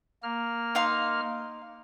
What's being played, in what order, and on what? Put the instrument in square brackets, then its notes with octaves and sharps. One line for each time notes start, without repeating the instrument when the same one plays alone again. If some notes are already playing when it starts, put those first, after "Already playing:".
[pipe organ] A#3 F6
[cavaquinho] D#4 F5 C6